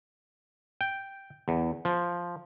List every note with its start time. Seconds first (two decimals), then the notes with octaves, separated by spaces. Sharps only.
0.81 G5
1.48 E2
1.85 F3